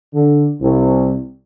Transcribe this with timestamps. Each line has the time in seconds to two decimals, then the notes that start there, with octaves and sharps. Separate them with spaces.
0.13 D3
0.61 C2